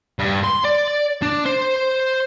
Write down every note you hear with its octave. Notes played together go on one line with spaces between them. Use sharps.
G2
C6
D5
D4
C5